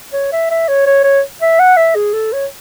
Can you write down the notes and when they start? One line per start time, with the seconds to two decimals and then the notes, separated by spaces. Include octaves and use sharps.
0.13 C#5
0.33 E5
0.51 E5
0.69 C#5
0.87 C#5
1.04 C#5
1.42 E5
1.59 F#5
1.77 E5
1.95 G#4
2.14 A4
2.33 C#5